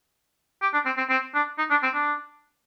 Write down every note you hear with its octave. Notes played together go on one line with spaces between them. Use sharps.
G4
D4
C4
C4
C4
D4
D#4
D4
C4
D4